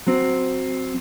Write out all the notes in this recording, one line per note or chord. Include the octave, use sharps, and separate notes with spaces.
F#3 C4